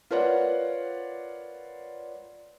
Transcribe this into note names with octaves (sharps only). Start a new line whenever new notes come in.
F4 A#4 B4 C#5 D5 F#5